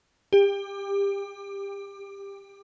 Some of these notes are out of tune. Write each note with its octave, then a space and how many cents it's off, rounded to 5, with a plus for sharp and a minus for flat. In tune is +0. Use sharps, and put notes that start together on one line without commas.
G4 +20